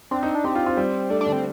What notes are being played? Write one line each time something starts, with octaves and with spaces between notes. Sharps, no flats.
C4 D4
D#4
D4
C4 G4
F4
F4
G3
A3 D4
D4
D3
C4